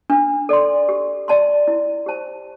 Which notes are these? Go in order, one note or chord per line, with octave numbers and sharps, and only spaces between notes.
D4
A4 D5 C6
G4
D5 A5 C6
E4
G4 C5 A5